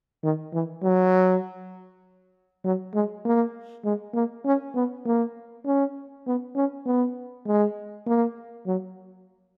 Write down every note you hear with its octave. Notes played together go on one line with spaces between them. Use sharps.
D#3
E3
F#3
F#3
G#3
A#3
G#3
A#3
C#4
B3
A#3
C#4
B3
C#4
B3
G#3
A#3
F#3